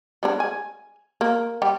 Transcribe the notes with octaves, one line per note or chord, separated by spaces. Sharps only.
G3 G#3 D4
G#5
A#3
G3 G4